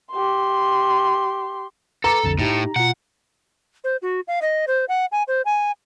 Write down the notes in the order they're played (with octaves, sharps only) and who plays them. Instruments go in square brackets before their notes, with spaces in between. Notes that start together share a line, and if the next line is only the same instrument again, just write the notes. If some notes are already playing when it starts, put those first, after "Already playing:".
[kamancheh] G4 C6
[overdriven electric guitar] A4 [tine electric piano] B4 D6 [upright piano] A#5
[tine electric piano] B1 F2 D3
[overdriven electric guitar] A2 [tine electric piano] D#4 G4
[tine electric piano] B2 F4 [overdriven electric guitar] F#5
[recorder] C5
F#4
F5
D#5
C5
F#5
G#5
C5
G#5